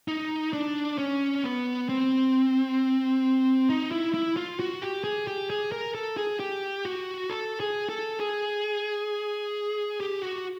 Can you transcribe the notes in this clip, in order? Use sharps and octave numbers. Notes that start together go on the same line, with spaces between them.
D#4
D4
C#4
B3
C4
D#4
E4
E4
F4
F#4
G4
G#4
G4
G#4
A#4
A4
G#4
G4
F#4
A4
G#4
A4
G#4
G4
F#4